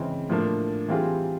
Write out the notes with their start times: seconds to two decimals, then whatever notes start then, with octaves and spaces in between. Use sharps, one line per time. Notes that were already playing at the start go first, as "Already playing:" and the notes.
Already playing: C#3 E3 G#3 C4
0.29 A2 F3 A#3 D4
0.88 E3 G3 C4 F4 G#4